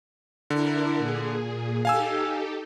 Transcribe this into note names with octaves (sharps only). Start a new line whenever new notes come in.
D3 D4 E4 A#4
A#2 G#4
D#4 G4 A4 F5 G#5 E6